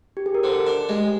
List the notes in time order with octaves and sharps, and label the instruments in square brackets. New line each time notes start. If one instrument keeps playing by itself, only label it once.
[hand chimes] G4
G#4
A#4
[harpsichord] D3 [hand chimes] C5
[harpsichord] D4 [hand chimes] G#4
[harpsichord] G#3 [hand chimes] G4